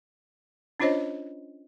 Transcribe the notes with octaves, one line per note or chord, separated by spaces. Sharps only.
C#4 D4 F4 C5 C#5 D#5